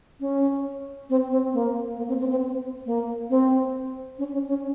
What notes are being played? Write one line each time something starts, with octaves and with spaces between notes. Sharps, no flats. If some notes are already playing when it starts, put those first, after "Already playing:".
C#4
C4
C4
A#3
A#3
C4
C4
C4
A#3
C4
C#4
C#4
C#4